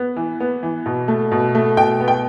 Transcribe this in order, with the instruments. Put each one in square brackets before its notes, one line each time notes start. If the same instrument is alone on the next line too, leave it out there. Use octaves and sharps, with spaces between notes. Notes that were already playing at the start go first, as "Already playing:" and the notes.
Already playing: [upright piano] B3
E3
B3
E3
B2
A3
B2
A3
B2 G5
B3
G5